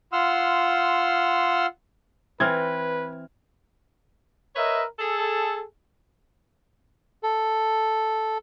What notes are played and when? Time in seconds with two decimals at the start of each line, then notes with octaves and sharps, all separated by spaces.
0.13 F4 F#5 C6 E6 F6
2.40 E3 C4 B4 F6 G#6
4.54 A#4 B4 C#5 D#5 E5
4.99 G#4 A4
7.23 A4